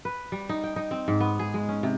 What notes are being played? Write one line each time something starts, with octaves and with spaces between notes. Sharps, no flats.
B4
G3
D#4
G5
D#4
C4
G#2
B3
G#4
G#3
C#4
C3